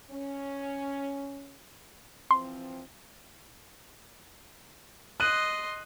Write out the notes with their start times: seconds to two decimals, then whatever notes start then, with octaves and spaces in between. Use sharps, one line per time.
0.11 C#4
2.31 E3 F3 C4 C6
5.20 D#5 C6 F#6 D#7